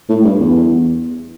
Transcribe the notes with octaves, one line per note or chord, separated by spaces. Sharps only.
A2
G2
E2